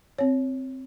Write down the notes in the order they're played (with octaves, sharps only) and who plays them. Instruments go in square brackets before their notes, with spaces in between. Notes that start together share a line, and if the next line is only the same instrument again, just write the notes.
[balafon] C4 C#5